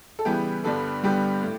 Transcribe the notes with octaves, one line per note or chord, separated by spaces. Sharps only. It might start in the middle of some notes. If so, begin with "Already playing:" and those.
A4
C#3 E3 G3 B3 G4
G2 D3 G3 B3 A4
G2 D3 G3 B3 G4
A2